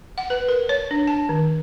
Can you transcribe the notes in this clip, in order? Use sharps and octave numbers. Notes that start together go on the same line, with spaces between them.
F#5
B4
A#4
C#5
D4
A5
D#3